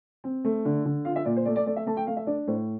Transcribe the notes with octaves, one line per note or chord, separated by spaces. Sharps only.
C4
A3
D3
D3
F4 F5
E5
A#2 D5
C5
A3 D5
D5
A3 D5
E5
A3 A5
G5
A3 F5
E5
D4 D5
A2 C5